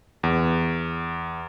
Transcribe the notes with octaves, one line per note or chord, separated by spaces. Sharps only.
E2